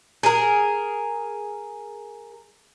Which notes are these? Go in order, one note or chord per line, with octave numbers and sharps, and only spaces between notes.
G#4 A#4